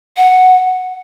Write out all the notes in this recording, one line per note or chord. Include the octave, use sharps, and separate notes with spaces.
F#5